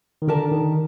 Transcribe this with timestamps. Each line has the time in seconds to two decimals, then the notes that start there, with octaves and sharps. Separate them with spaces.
0.22 D#3
0.28 D3 G4 A#4 D5 A5
0.51 D#3